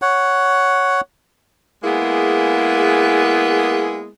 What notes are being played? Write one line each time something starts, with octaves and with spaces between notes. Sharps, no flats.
C#5 F#5
G#3 A#3 B3 E4 G#4